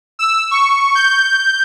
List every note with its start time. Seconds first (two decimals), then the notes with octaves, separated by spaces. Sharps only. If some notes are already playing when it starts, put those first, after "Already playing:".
0.19 E6
0.51 C#6
0.95 G6